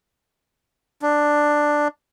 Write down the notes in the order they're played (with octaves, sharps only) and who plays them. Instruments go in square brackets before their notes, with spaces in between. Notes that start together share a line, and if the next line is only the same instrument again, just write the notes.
[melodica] D4